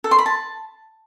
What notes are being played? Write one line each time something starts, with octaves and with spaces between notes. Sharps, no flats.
A4
C6
B5
A5